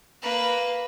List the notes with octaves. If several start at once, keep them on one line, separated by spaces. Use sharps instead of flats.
A#3 B4